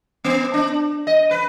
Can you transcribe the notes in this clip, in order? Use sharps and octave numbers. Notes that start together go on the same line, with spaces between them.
B3
D4
D#5
B4